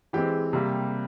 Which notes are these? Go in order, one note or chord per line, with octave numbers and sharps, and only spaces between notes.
E3 G#3 C4 G4
C3 G3 A#3